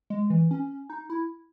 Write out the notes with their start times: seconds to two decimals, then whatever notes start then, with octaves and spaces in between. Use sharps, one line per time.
0.10 G#3
0.30 E3
0.51 C#4
0.90 D#4
1.10 E4